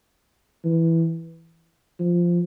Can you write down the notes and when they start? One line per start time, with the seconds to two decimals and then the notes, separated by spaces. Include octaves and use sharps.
0.64 E3
2.00 F3